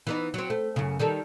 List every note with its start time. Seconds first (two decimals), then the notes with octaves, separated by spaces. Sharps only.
0.07 E3 B3 D#4
0.34 F#3 C4
0.50 A3
0.76 F#2 C#3
0.99 D#3 G3 A4